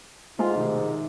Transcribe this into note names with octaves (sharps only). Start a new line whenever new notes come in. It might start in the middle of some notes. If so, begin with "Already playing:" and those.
G#2 G#3 A3 F4
B1 C3 D#3 D#4